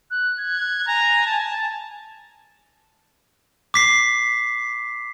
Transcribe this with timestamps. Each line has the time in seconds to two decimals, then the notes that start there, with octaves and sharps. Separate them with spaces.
0.11 F#6
0.39 G#6
0.87 G#5 A#5
1.26 A5
3.74 D6 B6 C7